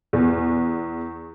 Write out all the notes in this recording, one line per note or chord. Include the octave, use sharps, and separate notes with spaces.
E2